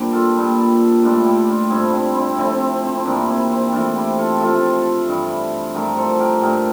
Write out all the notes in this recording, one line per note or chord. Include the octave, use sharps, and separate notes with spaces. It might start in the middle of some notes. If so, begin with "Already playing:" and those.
Already playing: G2 A#2 D3 G3 G4 C5 D5
F4 A4
A#2 G3
A2 G3 D4 F4
E4 G4
D4 F4
G2 D3 G3 C4 E4
C4 E4
C4 E4
C3 F3 A3 C4 E4
C4
C4
E4
G2 E3 G3 A#3 D4
C4 E4
C4 E4
C3 E3 A3 D4 F4
E4 G4
F4 A4
C3 F3 A3 F4 A4
G2 E3 G3
G2 F3 A3 G4 A#4
A4 C5
G4 A#4
G2 D3 A3 G4 A#4